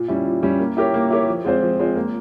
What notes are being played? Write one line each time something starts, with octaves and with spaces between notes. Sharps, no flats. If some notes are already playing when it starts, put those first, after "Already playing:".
Already playing: A#2
G3 C#4 E4
A#2
G3 C#4 E4
A#3
E4 G4 A#4 C#5
A#3
E4 G4 A#4 C#5
F3
G#3 C4 F4 C5
F3
G#3 C4 F4 C5
A#3